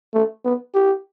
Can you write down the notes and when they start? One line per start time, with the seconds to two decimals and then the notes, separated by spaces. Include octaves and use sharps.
0.14 A3
0.45 B3
0.74 G4